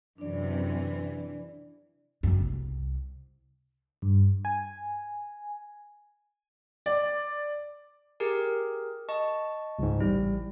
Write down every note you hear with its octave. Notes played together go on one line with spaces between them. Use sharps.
F#2 C3 E3 D4 D5
F#1 F#2
C2
G2
G#5
D5
G4 G#4 A#4
D#5 A5 C#6
C#2 G#2
A1 G3 E4